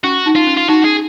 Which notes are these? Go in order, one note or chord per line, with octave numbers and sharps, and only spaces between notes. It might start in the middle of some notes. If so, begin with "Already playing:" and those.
C#4 F#4
D#4
F4
C#4
F4
D#4 F#4
G#4